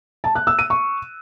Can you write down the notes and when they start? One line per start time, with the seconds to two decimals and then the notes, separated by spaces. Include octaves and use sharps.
0.24 A5
0.35 F#6
0.47 E6
0.59 D#7
0.70 C#6